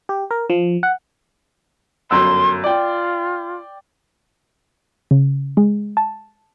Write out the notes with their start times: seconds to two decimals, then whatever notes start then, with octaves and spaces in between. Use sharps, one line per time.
0.09 G4
0.31 A#4
0.50 F3
0.83 F#5
2.11 G1 F#2 C6 E6
2.64 F4 D5 G5
5.11 C#3
5.57 G#3
5.97 A5